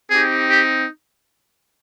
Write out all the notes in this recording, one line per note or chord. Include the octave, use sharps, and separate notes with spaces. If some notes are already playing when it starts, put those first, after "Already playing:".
C4 D#4 G4 G#4
G4